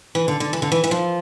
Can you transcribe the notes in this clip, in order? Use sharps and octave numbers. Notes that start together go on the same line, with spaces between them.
E3
D3
D3
E3
D3
E3
E3
F3